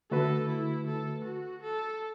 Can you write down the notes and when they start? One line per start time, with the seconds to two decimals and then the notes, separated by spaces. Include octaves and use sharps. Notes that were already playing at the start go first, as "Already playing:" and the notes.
0.11 D3 A3 F#4 A4 B4
0.49 E4
0.87 A4
1.24 F#4
1.62 A4